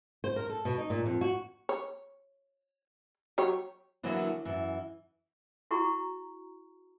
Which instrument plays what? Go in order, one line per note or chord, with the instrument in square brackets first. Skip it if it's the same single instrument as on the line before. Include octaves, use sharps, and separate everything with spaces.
[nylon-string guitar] C5
A#4
A4
B2
D#4
A#2
F2
F#4
[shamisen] C#5
F#3 G4 C#5
[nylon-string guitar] D3 E3 F#3 A#3 B3 D4
F#2 E3
[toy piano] E4 F#4 G#4 A#5 C#6